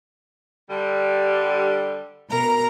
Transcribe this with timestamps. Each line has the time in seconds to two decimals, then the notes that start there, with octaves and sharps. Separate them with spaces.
0.68 D3 G3
2.30 B2 A#4 A#5